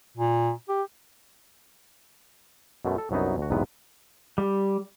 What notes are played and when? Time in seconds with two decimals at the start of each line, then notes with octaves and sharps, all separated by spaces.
0.17 A#2
0.68 G4
2.85 F#2 B2 G#3 A3
2.98 A4
3.11 C2 F#2 F#3 B3 D#4
3.38 D2 F#4
3.50 B1 E2 G#2 C3 B3 B4
4.38 G3